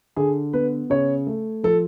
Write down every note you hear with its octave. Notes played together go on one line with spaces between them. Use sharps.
D3 G#4
B3 B4
C#3 C#5
A3
F3 A4